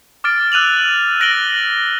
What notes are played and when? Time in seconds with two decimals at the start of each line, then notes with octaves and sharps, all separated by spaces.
0.24 D6 F6 A6 D7
0.52 E6 F#6 D#7 F7 F#7
1.20 F#6 A#6 D7 F#7 G7